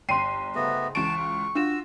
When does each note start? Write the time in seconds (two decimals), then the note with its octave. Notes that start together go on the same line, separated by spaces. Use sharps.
0.09 G1 G5 C6 C7 D#7
0.55 G#2 C#3 A3 B3 F#4
0.95 C#2 E3 A5 C#6 D7
1.19 F4
1.55 D4 F4 F#4 E6 E7